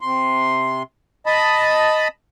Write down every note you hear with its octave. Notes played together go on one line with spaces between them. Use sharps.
C3 C6
D#5 A5 B5